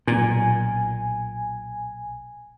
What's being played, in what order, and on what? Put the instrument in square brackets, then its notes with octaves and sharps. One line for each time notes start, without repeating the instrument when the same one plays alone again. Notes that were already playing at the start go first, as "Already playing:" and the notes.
[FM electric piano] B1 G#5 [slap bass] A#2